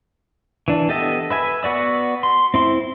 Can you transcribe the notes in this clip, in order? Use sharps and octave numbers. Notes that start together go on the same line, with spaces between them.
E3 D4
B3 G4 A4 D#5 E5
B4 E5 G#5
B3 F#4 D5 E6
C6
C4 E4 C6